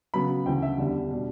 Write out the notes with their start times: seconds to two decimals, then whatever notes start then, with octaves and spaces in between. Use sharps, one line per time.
0.14 C#3 F#3 B3 B5
0.46 D2 C#3 E3 G5
0.62 E5
0.78 E2 D3 G3
1.11 B2 G3 D4